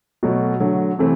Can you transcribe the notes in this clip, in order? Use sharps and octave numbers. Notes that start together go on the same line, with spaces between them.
B2 F#3 A3
D3 F#3 A3
C3 E3 A3 C4